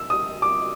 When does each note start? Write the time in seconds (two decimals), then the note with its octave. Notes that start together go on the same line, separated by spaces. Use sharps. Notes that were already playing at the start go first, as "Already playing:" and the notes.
Already playing: E6
0.10 D#6
0.42 D6